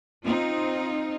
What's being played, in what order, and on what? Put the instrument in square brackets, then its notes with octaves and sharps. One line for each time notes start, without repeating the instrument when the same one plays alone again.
[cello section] C4 D#4 F4